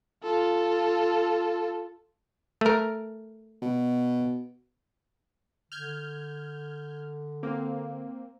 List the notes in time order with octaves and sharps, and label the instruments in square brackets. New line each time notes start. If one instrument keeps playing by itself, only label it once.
[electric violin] F4 A4
[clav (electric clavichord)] A3 A#4
[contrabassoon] B2
[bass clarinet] D3 [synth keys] F6 G6 G#6
[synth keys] A#3 C4